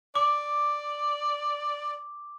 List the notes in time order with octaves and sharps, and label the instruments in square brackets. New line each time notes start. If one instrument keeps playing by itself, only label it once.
[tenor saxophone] D5 [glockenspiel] D6